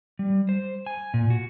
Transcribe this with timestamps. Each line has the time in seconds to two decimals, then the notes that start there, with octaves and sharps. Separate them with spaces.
0.19 G3
0.49 C5
0.86 G#5
1.14 A#2
1.30 F#4